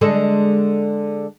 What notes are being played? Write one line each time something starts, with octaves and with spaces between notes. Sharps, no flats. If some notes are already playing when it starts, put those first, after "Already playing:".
D3 G#3 A4